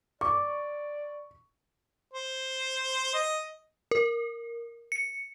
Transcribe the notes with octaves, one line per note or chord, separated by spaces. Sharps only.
D5 C#6 D6
C5
D#5
A#4
C#7